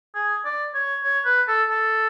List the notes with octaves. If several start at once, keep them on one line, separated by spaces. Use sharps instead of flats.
G#4
D5
C#5
C#5
B4
A4
A4